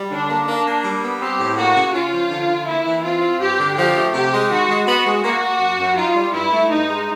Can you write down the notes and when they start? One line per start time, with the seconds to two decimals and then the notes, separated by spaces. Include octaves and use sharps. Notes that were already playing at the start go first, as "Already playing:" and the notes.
Already playing: G3
0.11 D3 D4
0.29 A#3
0.47 A#3 D4
0.66 A#3
0.84 G3
1.03 B3
1.21 C4 G4
1.39 A2
1.58 A#3 F#4
1.76 C#3
1.94 C#4 F4
2.12 F3
2.31 D3
2.49 D3
2.67 A#3 E4
2.86 E3
3.04 C4 F4
3.22 C4
3.41 G2 G4
3.59 D3
3.77 F3 G4
3.96 A3
4.14 C3 G4
4.33 G#3
4.51 D#3 F#4
4.69 G#3
4.87 B3 F#4
5.06 G#3
5.24 A#3 F#4
5.42 A#3
5.60 F#2
5.79 F#2
5.97 D#4 F4
6.15 G3
6.34 G2 E4
6.52 A3
6.71 G2 D#4
6.89 G#3